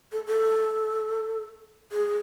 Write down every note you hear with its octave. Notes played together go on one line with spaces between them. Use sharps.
A4
A4
G#4